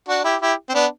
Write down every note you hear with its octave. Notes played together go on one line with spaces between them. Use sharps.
D4 F#4
E4 G4
E4 G4
C4
B3 D4